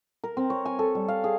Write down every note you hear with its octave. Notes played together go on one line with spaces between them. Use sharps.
A#4
C4
C#5
G#5
A4
G3
F5
G#4